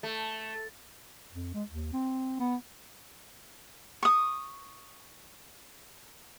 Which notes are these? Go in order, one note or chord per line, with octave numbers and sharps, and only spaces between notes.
A3
F2
G#3
D#2
C4
B3
C#6 D#6